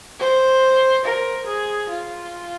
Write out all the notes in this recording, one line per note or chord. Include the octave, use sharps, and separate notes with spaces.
C5
A#4
G#4
F4